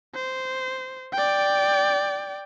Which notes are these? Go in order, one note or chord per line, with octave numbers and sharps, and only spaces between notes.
C5
D5 G5